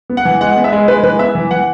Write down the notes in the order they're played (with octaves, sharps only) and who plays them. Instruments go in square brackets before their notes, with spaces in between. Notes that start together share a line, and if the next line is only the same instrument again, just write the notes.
[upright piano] B3
F#5
E3
G#3 F#5
B3
E5
G#3
G#3 B4
E3 B4
B3 E5
E3
E3 F#5